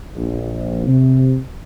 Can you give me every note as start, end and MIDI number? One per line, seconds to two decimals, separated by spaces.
0.16 0.84 34
0.87 1.38 48